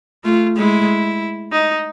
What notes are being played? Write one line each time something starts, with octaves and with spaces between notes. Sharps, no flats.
A3 F4
G#3 E4
D#4